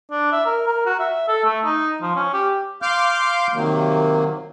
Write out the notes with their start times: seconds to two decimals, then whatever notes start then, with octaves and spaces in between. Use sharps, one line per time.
0.11 D4
0.32 E5
0.46 A#4
0.67 A#4
0.86 F#4
0.99 E5
1.28 A4
1.45 A3
1.64 D#4
2.02 F3
2.16 C#4
2.33 G4
2.82 F5 C6 D6 F6 G6
3.53 C3 D#3 F#3 A#3